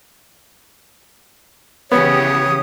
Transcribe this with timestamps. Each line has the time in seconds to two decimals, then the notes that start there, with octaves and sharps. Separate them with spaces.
1.92 C#3 E3 B3 G4 C#5 D#6